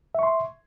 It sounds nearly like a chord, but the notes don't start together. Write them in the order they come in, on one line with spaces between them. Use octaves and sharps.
E5 C#6 C6